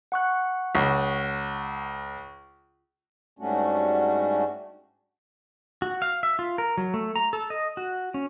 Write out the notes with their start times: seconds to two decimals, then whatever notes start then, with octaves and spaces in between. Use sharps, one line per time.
0.12 F#5 C#6 F#6
0.75 C#2
3.39 G#2 G3 A3 C#4 D4 F#4
5.82 F#4
6.02 F5
6.23 E5
6.39 F4
6.58 A#4
6.77 F#3
6.94 A3
7.16 A#5
7.33 A4
7.50 D#5
7.77 F#4
8.14 C#4